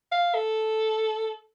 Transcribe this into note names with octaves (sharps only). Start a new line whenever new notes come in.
F5
A4